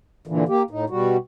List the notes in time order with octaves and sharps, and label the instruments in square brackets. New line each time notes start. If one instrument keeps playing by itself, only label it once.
[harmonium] A#2 D3 E3
A#3 G4
A2 D#4
B2 G3 F#4